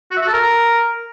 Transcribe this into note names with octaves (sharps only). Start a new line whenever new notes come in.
F#4
E5
F#4
A4
A#4